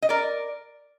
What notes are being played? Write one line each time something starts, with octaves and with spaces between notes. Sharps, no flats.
D#5
A#4 D5